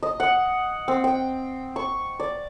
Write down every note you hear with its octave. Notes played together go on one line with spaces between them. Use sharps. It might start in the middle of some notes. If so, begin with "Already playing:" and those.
D#5
F#5
C4
G5
C#6
D5